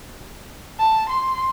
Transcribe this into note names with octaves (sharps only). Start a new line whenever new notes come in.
A5
C6